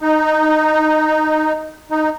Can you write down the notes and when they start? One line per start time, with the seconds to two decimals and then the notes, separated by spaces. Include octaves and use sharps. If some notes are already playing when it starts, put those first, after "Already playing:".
0.01 D#4
1.91 D#4